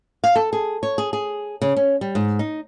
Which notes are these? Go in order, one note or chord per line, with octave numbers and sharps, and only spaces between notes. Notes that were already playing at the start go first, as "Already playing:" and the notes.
F5
A4
G#4
C#5
G#4
G#4
C#3
C#4
G3
G#2
D#4